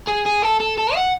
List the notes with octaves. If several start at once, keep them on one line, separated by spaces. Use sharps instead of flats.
G#4
G#4
A4
A4
A4
F#5